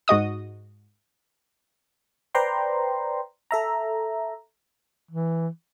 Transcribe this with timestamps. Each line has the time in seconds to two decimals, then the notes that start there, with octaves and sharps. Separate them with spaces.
0.08 G#2 F#4 D#5 D#6
2.35 B4 C5 D5 G5 A#5 C6
3.51 A4 E5 A#5
5.11 E3